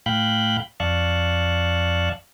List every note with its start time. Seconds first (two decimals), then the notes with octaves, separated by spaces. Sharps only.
0.06 A2 F5 G5 B5 F#6 G6
0.80 F2 D5 F5 A5 C#6 F#6